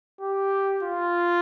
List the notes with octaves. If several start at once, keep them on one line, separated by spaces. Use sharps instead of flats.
G4
F4